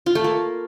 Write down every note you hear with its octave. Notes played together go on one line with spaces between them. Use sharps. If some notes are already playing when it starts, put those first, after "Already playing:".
F4
A3
A#3